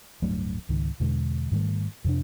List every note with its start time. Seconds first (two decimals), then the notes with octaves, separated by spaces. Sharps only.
0.22 D1 G2 F#3 A3
0.69 C#2 G#2 D#3
1.00 E2 B2 D3 G#3
1.52 G#2 D#3 G3 A3
2.05 F2 C3 D4